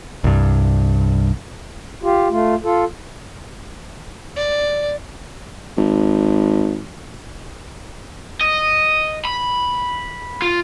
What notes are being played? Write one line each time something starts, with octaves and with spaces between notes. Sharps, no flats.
C2 G2
F4 G4
A3 F4
F4 A4
D5
G#1
D#5
B5
F4